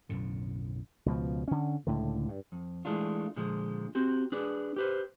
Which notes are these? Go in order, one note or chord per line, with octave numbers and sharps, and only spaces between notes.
B1 F#2 A2 D3
C#2 B2 F3
D3 C#4
C#2 A2 D3
G2
F2
E3 F3 G#3 A3 D4 F4
A#2 D3 F3 G#3
C4 F#4 G4
D4 G#4 B4 D5
G4 B4 C5